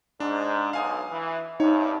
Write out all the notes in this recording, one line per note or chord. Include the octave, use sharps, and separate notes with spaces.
G#2 D4
B1 F5 G#5 D#6
E3
C2 G2 D#4 C#5